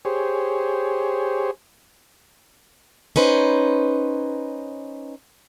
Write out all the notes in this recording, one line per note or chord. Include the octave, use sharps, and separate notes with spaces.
G4 G#4 C5 C#5
C#4 D#4 B4 C5